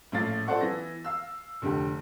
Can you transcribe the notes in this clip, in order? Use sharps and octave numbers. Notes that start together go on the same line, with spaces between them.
A#1 A2 C#4 F5 A6
F4 A4 C5 D5 F#5 C#6
E3 B3 A#6
F5 E6
F1 D3 G4